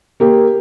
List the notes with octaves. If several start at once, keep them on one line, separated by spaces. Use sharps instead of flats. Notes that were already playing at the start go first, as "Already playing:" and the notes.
A#3 G4